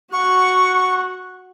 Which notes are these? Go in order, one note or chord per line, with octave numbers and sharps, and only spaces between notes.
F#4 F#5 C#6